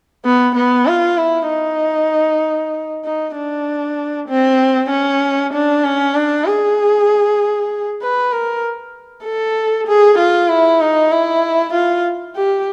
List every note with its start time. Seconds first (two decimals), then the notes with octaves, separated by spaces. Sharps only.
0.25 B3
0.56 B3
0.87 F4
1.18 E4
1.49 D#4
3.05 D#4
3.36 D4
4.29 C4
4.90 C#4
5.53 D4
5.84 C#4
6.15 D4
6.46 G#4
8.02 B4
8.32 A#4
9.25 A4
9.87 G#4
10.19 F4
10.50 E4
10.81 D#4
11.12 E4
11.73 F4
12.36 G4